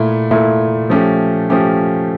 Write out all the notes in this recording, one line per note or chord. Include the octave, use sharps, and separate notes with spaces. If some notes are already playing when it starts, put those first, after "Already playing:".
Already playing: A#2 A3 E4
A#2 A3 E4
F3 A3 C#4 G4
F3 A3 C#4 G4